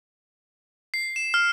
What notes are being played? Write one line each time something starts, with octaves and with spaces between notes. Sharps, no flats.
C7
E7
F6